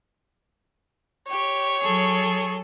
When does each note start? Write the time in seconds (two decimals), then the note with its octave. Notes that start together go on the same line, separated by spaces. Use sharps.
1.29 G4 C#5
1.82 F#3 G#4 A4